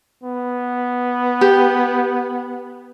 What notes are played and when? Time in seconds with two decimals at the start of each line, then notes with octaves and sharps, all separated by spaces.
0.24 B3
1.41 G4